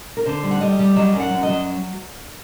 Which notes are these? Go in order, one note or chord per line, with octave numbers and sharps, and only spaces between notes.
A#4
D3 C5
G3
F#5
G3 D#5
G3
F#3 D#5
F#2
F#5
F#2
D#5
F#3